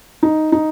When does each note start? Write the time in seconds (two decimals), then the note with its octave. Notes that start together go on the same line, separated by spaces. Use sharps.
0.23 D#4
0.52 D#4